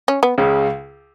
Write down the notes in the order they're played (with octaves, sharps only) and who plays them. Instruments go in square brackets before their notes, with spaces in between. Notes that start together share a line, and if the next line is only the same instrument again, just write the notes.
[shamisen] C#4
B3
[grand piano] C#2 C#3